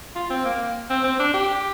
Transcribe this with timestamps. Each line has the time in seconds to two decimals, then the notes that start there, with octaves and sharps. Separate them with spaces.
0.16 F4
0.30 C4
0.45 A#3
0.90 C4
1.04 C4
1.20 D4
1.34 G4